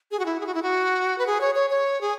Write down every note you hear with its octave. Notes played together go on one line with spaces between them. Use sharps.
G#4
F#4
E4
G#4
F#4
E4
F#4
B4
G#4
C#5
C#5
C#5
G#4